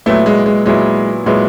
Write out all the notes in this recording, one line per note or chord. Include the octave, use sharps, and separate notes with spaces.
A#2 F#3 A3 B3 E4
G#3
G#3
A#2 F#3 G#3 B3 E4
A#2 F#3 G#3 B3 E4